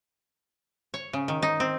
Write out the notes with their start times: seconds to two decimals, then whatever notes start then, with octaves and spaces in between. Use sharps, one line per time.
0.94 C#5
1.13 C#3
1.28 D#3
1.42 D#4
1.60 C4